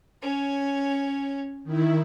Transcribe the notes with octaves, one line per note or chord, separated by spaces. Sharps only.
C#4 C#5
D#3 E4